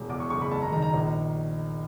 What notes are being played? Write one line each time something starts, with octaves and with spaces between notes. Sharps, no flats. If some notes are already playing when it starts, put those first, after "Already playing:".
Already playing: E1
E2 D6
C#6
F#1 C#6
B5
G#1 A5
A#5
D#3 A#5
A#5
A#1